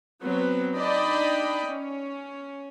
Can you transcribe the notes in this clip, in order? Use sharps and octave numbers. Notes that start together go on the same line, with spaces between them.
F#3 B3 C4 B4
D4 D#4 D5 D#5 G5 B5
C#4